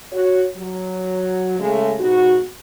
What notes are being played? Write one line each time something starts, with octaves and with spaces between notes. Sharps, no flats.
F#4 C#5
F#3
C#3 G#3 A3
G#2 B2 D#4 F#4